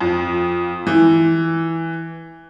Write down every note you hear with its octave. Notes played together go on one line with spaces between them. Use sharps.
F2
E3